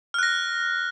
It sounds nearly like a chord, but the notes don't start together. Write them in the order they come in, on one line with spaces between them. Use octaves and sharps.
F6 F#6 A#6